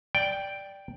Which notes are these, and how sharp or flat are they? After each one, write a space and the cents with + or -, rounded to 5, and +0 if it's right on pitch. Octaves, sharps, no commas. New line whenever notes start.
D5 +0 G5 +0